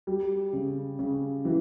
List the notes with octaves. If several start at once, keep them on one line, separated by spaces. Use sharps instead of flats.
G3
C#3
C#3
E3